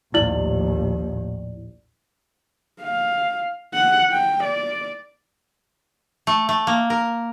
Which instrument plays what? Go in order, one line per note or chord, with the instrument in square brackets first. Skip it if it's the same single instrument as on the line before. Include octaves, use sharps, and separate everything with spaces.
[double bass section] A#1 D#2 A2 [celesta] E4 D5 F#7
[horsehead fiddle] F5
F#5
G5
D5
[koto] A3
A3
A#3
A#4